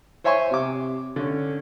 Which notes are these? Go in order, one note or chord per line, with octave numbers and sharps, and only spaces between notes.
C5 C#5 E5 G#5 C6 C#6
C3 D6
D3 C#4